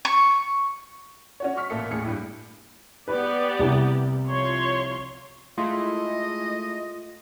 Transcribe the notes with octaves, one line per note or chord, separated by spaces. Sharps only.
C#6
C#4 F#4 C#5
C#6 F6 B6
A1 A#2 A#3 A4 E5 C#7
D#2 A2 G#4 C#7
G2 E4
B3 G4 B4 D5
C2 C3
F3 C#5 C6
G#3 A3 E4 F4 D#5